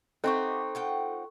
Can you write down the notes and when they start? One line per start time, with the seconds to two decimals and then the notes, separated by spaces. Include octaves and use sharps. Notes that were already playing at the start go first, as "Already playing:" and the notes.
0.24 C4 D#4 G4 A4 E5 F#5 C#6
0.75 F4 F#5 G5